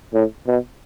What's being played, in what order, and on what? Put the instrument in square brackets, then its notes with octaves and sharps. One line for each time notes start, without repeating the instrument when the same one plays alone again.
[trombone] A2
B2